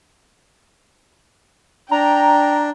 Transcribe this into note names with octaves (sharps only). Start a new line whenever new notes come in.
D4 G5 A#5